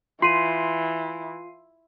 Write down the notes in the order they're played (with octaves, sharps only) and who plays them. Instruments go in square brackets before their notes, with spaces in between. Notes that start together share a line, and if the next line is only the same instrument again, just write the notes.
[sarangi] E3 [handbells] F4 [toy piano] C6 [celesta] C7 D#7